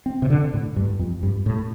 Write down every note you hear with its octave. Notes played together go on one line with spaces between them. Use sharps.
C4
C3
D3
A2
G2
F2
G2
A2